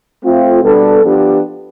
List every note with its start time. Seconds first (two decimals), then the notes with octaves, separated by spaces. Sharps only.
0.24 A3 C4 F4
0.63 B2 G3 B3 D4 A4
1.02 F3 B3 D4 G4